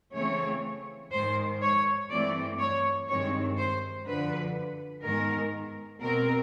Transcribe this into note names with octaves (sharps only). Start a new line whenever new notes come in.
C#3 E3 A3 C4 C#5
G#2 D#3 G#3 C5
C#5
G2 E3 A3 C4 D5
C#5
G2 D#3 G#3 C4 C#5
C5
F#2 D3 F3 B4
G#2 D#3 G#3 B3 A#4
B2 G#3 C4 A#4